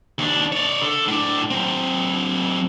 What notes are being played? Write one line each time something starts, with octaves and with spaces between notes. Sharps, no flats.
D#2 D4
C#5 D5
D3 A4
A2 D4
F#3 C4